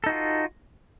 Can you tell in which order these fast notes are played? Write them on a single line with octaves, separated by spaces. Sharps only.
A4 D#4 F#4 F4